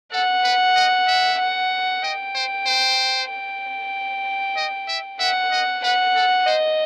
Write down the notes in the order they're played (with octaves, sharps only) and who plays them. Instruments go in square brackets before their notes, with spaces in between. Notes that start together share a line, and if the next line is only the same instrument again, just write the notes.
[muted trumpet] A4 [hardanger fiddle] F#5
[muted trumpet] B4
D#5
E5
[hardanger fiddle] F#5
[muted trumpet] D#5 [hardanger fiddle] G5
[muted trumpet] C5
C5
[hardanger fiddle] G5
[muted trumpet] D#5
E5
[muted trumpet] E5 [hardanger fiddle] F#5
[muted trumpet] D#5
[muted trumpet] B4 [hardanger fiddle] F#5
[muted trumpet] A4
[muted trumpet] C5 [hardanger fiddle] D#5